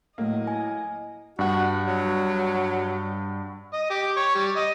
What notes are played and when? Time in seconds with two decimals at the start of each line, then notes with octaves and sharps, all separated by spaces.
0.18 A2 F#3 A#3 D#5
0.47 G#5
1.39 G2 F#4 F#5
1.84 F#3
3.73 D#5
3.90 G4
4.17 C#5
4.35 G3
4.56 D#5